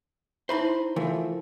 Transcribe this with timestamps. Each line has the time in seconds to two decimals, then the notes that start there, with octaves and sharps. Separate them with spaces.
0.49 D#4 E4 C5 E5 B5 C6
0.96 E3 F3 A3 A#4 F5